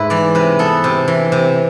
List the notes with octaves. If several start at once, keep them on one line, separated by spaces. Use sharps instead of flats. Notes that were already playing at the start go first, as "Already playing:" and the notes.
Already playing: G#2 A3 E4 B4
E3 D5
C3 B4
B3 A4
C3
E3
C3